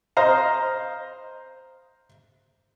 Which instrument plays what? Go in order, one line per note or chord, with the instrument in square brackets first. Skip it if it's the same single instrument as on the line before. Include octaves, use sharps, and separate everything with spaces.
[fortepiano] C5 D#5 F5 A#5